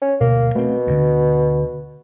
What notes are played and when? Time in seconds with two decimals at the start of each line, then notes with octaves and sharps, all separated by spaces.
0.01 C#4
0.21 D2 B2 A#3
0.55 B2 A3 C4
0.87 D2 D3